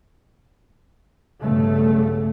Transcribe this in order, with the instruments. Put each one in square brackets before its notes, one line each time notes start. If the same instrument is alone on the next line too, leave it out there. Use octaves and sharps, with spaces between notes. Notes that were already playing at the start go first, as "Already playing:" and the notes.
[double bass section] B1 G2 C#3 A3